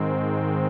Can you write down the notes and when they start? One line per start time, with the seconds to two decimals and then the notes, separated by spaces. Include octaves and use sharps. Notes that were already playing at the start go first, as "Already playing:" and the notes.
Already playing: G#2 D#3 G#3 C4